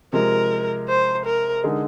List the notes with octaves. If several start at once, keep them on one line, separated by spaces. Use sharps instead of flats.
C3 F3 G#3 A#4
C5
A#4
D3 G#3 D#4 G#4